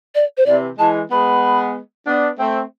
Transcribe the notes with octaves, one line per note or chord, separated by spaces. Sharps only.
D5
C5
C3 E3 D5
E3 G#3 A5
G#3 B3 B5
B3 D4
A3 C4